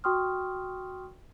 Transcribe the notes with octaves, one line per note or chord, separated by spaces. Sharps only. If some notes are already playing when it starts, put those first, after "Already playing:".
F#4 G5 C6 C#6 D#6 F6